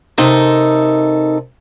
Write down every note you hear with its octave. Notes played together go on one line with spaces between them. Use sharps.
C3 D#4 A4 A#4